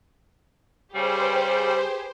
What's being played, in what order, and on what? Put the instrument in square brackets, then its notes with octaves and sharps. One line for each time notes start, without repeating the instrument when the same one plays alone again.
[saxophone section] C#3 G3 [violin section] G4 G#4 B4 [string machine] C5